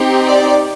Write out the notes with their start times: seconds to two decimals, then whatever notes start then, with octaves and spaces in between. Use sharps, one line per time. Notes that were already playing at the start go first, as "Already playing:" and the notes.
Already playing: C4 D#4 G4
0.25 D5